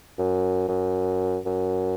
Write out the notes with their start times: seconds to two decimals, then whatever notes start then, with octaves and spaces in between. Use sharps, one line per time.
0.18 F#2
0.68 F#2
1.46 F#2